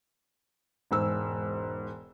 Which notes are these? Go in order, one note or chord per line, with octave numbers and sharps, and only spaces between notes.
E1 G#2 E6